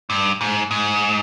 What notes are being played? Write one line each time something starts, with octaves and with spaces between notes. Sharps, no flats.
G2
G#2
G#2